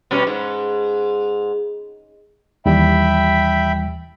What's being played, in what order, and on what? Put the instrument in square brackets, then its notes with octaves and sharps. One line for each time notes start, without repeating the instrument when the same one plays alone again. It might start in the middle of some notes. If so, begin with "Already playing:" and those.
[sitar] B2 G3 C#4
G#2
[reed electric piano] D#2 E3 G3 [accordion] E5 G5 B5